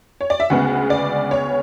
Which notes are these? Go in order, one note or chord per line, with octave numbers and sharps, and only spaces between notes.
C#5
D5
E5
D2 C#3 G#3 B3 F#5
D5
C#5